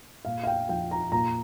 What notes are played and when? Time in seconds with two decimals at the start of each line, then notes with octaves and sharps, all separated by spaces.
0.25 A#2 F5
0.44 F5
0.47 G5
0.69 F3 G5
0.91 A#5
1.12 A#2 A#5